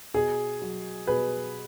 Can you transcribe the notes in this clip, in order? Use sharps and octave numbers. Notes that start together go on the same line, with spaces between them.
B2 G#4
F#3
B2 G#4 B4